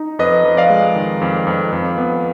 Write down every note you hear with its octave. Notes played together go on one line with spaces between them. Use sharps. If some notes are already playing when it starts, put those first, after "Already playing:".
Already playing: D#4
F2 B4 D#5
F2
D5 F5
G#3
D#3
F2
F2
F2
B3